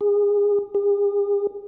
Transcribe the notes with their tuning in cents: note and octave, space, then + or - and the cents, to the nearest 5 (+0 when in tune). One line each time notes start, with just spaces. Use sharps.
G#4 -25
G#4 -45